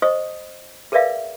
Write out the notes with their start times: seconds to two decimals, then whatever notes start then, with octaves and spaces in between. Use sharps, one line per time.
0.02 C5 D#5 C#6 D#6
0.92 G#4 A#4 B4 D5 E5 F5